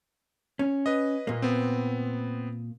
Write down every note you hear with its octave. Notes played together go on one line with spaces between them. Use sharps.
C#4
B4 D#5
A#2 A#3
B3 C4